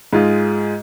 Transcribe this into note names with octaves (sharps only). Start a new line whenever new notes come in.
G#2 G#3 F4